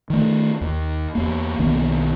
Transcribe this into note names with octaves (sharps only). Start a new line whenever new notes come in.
D#3 A3
D#2
E2 A#3
B1 D#3 A#3 B3